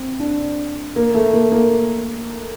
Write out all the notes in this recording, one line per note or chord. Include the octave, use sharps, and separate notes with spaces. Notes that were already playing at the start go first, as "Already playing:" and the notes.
Already playing: C4
D4
A#3
A3
A#3
A#3